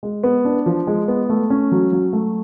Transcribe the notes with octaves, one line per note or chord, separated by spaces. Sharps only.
G#3
B3
D4
F3
G#3
B3
A3
C#4
F#3
F#3
A3